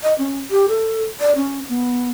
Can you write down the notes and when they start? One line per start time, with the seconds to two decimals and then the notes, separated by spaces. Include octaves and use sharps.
0.03 D#5
0.18 C#4
0.50 G4
0.68 A4
1.20 D5
1.36 C#4
1.69 B3